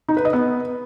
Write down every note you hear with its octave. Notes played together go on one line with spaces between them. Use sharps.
D#4
B4
D#5
B3